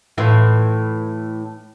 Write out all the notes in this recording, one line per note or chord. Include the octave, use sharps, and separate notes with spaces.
A2 E3 F4